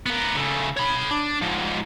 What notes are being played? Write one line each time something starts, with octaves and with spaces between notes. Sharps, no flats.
B3 A#4
C#3 A3
C#5 B5
D4
G#2 F3